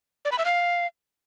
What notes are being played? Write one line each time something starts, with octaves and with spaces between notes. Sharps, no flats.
D5
B5
E5
F5